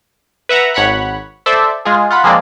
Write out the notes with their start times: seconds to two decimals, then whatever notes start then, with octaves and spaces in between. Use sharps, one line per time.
0.49 B4 E5 F#5 A#5
0.74 G#1 C#5 F#5 B5 F#6
1.46 A4 C5 D5 E5
1.85 G#3 F4 G#4
2.11 F4 F#5 B5
2.24 F3 G#3 A#3 C4 G#4 D5